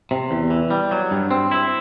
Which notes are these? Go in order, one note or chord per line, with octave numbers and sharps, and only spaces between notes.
C3
E2
E3
G3
F#3
G2
C4
E4